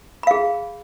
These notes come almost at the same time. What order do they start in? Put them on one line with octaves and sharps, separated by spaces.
B5 F5 G#4